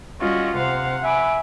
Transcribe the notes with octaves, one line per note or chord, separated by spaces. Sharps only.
G3 C#4 F4 F#4 D#5
C3 C5 F5 F#5
E5 G#5 B5 D6